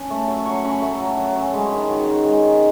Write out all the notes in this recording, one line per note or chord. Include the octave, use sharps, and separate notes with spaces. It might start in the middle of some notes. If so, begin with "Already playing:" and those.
Already playing: C#4 A5 B5
A3
F#3
F#3 C#6
C#4 B5
A3
F#3
F#3
C#4
G#3 B5
C#5
D#3
G#4
D#3 F#4
D#4
G#3
D#3